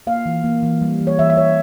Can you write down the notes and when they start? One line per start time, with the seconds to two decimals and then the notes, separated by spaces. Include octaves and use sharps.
0.07 A#3 F5
0.26 E3
0.44 A#3
0.63 E3
0.82 G3
1.01 E3
1.07 C#5
1.19 E3 E5
1.30 E5
1.37 E3 C#5